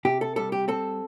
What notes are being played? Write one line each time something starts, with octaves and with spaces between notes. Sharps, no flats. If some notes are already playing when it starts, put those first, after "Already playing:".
C3 G4
A4
G3 A4
G4
C4 A4